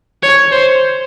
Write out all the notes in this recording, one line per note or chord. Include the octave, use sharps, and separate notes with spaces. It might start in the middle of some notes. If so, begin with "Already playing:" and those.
C#5
C5